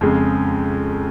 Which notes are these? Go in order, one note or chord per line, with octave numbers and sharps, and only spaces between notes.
F2 C#3 G#3